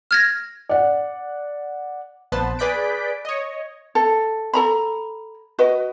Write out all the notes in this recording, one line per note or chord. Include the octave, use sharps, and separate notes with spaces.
F6 G#6 A#6
D5 F#5
A#1 B3 B4 C5 A5
G#4 B4 D5 G6 B6 D7
C#5 D#5
A4
A4 A#5 B5
F#4 B4 D#5